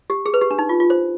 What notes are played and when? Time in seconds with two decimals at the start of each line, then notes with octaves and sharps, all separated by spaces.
0.10 G4
0.26 G#4
0.34 B4
0.41 G4
0.51 D4
0.59 D#4
0.69 F4
0.80 F4
0.90 C5